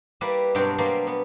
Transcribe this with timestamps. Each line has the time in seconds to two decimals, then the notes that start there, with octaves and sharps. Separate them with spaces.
0.21 G3 A#3 E4 B4 D5
0.55 G2 B2 F#3 C4 D4 G5
0.78 B2 F#3 G3 A#3 D5 C6
1.07 B3